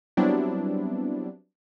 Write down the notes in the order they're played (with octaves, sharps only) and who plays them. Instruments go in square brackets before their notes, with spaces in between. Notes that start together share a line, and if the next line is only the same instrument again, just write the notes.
[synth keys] F#3 G3 B3 C4 D4 E4